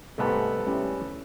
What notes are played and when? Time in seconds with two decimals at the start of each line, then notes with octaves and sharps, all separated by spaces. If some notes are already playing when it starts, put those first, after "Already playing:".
0.18 C2 G#2 C3 A3 B3 A4
0.67 G3 G#3 C#4 E4 G4